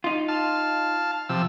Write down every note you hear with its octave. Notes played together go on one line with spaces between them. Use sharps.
D#4 F4
F5 A5
C3 F3 E6